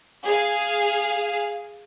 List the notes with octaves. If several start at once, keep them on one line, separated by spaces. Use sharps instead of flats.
G#4 F5